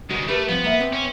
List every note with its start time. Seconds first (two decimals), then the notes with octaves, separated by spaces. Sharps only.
0.10 D2 G#3 F#4
0.28 A3 G4 A#4 B4
0.49 F3 B3 C4
0.64 A#3 E5
0.80 B3 C4 D4
0.93 C#4